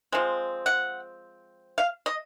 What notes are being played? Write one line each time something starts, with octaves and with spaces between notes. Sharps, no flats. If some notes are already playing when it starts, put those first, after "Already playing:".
F3 G#3 C4
F#5
F5
D#5